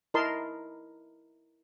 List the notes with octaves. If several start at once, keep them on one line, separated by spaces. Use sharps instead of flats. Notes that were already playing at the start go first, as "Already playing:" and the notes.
E4 A#4 D#5 A5 C6